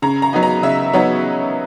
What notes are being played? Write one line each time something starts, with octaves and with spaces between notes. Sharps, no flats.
C#3 A#5
A#5
F#3 B3 D#4
A#5
C#3 E5
F#3 B3 D#4 C#5